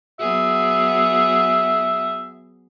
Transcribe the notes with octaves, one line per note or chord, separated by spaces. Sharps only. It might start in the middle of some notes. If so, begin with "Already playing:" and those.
F#3 B3 G#4 E5